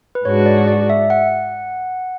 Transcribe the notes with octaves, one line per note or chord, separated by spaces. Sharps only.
B4
G#2 G#3 D4 F#4 C#5
D5
D5
E5
F#5